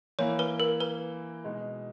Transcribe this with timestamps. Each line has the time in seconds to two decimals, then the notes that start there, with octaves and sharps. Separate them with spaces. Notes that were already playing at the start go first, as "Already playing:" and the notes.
0.19 E3 A#3 E4 C#5
0.39 B4
0.60 A#4
0.80 B4
1.44 B2 G#3 D#4